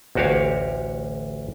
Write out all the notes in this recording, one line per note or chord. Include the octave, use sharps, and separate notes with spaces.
A1 D2 F#4 G4 C#5 F5